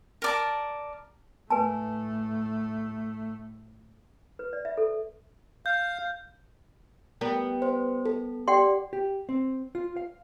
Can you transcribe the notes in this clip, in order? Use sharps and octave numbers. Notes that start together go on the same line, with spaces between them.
A#4 D5 A5
A2 A3 B4 G#5 A5
B4
D5
E5
A4
F5 G6
G3 B3 A#4
C5
A4
G4 D5 F#5 G5 C6
G4
C4
F4
F5